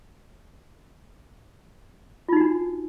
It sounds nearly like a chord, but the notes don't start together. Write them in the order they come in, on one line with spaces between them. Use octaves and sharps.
F4 D#4 F#4 D4